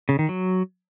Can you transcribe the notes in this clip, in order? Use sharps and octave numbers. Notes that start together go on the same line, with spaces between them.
C#3
D#3
F#3